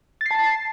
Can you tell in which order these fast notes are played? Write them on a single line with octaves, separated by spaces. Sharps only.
A6 C7 A5